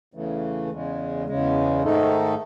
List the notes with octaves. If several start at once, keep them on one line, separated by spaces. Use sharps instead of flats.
E2 C#3 E3 A3
E2 C#3 G#3
E2 C#3 G#3
G#2 D#3 A3 D#4 A4